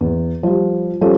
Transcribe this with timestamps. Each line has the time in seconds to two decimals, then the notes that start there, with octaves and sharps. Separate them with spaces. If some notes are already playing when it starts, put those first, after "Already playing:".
0.01 E2
0.43 F3 G3
1.01 F3 G3 C#4 A4